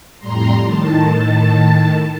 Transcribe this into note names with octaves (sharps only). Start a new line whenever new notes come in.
F2 A2 G3 A#5 C6
A2 D#3 A5